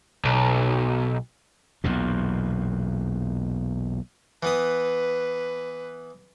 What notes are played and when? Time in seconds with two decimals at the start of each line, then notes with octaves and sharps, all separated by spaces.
0.25 B1
1.84 B1 E2 A#2
4.43 E3 B3 B4 D#6